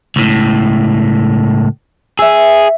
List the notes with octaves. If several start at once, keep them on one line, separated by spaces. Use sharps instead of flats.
C#2 A2
G#4 E5 E6